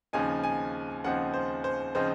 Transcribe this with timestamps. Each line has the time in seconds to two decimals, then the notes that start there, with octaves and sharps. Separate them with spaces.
0.13 D#2 C#3 F3 C4 D#4 G#5
0.43 G#5
1.04 D#2 C#3 F3 C4 D#4 F#5
1.34 C5
1.64 C5
1.95 C#3 F3 C4 D#4 C5